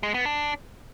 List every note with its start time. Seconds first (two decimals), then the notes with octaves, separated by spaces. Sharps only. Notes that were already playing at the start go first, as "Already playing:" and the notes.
0.03 G#3
0.14 B3
0.26 D4